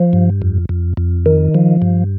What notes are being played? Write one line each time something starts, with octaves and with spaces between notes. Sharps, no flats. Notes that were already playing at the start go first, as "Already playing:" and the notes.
Already playing: F3
G2
F2
F2
F2
D#3
F3
G2